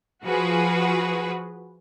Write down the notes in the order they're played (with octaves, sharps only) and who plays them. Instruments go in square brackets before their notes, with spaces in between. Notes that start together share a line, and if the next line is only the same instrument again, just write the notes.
[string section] F3 F#4 G#4 B4